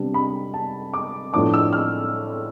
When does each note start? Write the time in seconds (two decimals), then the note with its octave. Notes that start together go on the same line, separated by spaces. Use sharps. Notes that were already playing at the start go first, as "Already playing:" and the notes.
Already playing: C3 G3 B3 D4
0.14 B5
0.54 A5
0.94 D6
1.33 A2 F3 B3 D4 D6
1.54 E6
1.73 F6